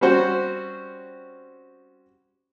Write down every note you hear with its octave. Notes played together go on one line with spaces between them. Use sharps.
G3 C4 C#4 F#4 C5